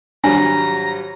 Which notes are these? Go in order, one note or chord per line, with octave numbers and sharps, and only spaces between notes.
G#1 F#3 G3 D4 G#5 A#5